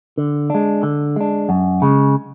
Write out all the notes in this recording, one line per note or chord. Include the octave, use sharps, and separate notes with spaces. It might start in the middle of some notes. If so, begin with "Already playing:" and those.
D3
G#3 D4
D3
G#3 D4
F#2
C#3 G#3